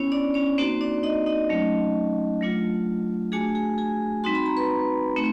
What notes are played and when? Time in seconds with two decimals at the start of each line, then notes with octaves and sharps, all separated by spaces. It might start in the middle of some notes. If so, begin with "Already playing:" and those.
Already playing: B3 C#4 E4 C#5
0.12 D4 D5
0.34 C#4 C#5
0.58 A#3 C4 D#4 F#4 C5
0.81 D4 D5
1.03 D#4 D#5
1.26 D#4 D#5
1.49 F#3 A3 C#4
2.41 F#3 A3 D4 F4
3.32 A3 D4 F#4 G#4 G#5
3.55 G#4 G#5
3.78 G#4 G#5
4.24 G3 C4 D#4 F#4 C6
4.35 B5
4.46 A#5
4.56 B4 B5
5.16 A3 C4 D#4